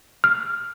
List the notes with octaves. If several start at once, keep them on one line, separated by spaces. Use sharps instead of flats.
F6